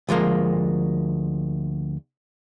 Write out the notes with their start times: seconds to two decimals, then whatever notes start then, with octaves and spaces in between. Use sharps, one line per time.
0.09 D2 F3 G#3 A#3